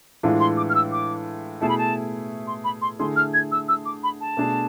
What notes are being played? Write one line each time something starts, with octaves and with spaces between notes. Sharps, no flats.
A2 E3 G#3 D4 F4
C6
D6
F6
E6
D6
B2 A3 E4 G#4 A5
B5
A5
C6
B5
C6
D3 A3 E4 G#4 C6
F6
G#6
E6
E6
D6
B5
A5
B2 A3 D4 G#4